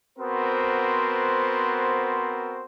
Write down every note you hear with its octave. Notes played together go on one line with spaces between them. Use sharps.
B3 C4 F#4 A#4 C5